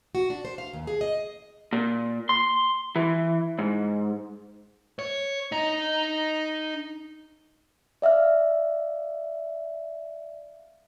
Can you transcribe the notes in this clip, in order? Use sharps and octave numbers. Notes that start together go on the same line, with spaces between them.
F#4
D4
C5
F5
D#2
G#4
D#5
A#2
C6
E3
G#2
C#5
D#4 D#5
D5 E5 F5 F6